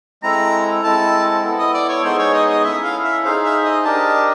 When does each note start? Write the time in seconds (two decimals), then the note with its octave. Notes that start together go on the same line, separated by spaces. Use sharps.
0.22 G#3 C4 E4 A4 A#5
0.83 G#3 C4 E4 A4 A5
1.43 B3 E4 A4
1.59 D#5
1.74 D5
1.89 C#5
2.03 G#3 B3 D#4 G#4 C5
2.19 C#5
2.34 D#5
2.49 D#5
2.64 C#4 E4 A4 E5
2.83 F5
3.04 E5
3.24 D#4 G#4 C5 F5
3.44 E5
3.64 D#5
3.85 D4 G4 A#4 D#5 A5